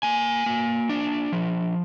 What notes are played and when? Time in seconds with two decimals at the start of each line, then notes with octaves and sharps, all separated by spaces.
0.03 A#3 G#5
0.46 A#3
0.89 D4
1.32 F3